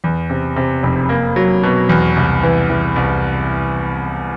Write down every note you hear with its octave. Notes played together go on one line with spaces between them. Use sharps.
E2
C3
C3
F1
A#3
F#3
B2
E2
C2
E3
E3
C2